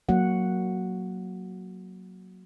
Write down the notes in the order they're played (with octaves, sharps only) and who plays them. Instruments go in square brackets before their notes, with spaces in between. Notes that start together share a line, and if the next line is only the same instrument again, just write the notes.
[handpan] F#3 A#3 F#4 F#5